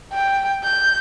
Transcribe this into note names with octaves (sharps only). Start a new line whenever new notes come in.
G5
G6